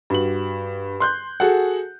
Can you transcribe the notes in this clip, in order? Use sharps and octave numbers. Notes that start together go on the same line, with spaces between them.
G2 F#4 F#7
C6 F#6 G6
F#4 G#4 A4 F#5